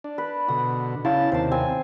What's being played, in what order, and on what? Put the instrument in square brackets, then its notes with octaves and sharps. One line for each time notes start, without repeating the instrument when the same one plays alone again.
[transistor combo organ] D4
[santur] B4
[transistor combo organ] B2 D3 [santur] D#6
[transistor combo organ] C#3 A5 [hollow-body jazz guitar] E4 C#5 F5
[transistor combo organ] D#2 C3 [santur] C5 A5
[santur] C4 G#5